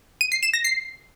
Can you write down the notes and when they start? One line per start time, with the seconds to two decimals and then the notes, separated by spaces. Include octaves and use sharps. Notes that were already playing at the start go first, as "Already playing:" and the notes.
0.21 D#7
0.32 C7
0.43 E7
0.54 A#6
0.64 C7